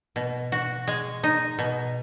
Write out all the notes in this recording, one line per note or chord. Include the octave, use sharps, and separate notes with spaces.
B2
F#4
G#3
D#4
B2